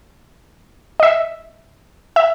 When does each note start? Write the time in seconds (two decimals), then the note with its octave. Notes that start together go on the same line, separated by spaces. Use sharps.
1.00 D#5 E5
2.16 E5